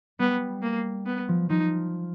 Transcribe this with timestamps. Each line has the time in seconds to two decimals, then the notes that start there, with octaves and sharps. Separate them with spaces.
0.19 G3 B3
0.62 A#3
1.06 B3
1.28 F3
1.50 F3 D#4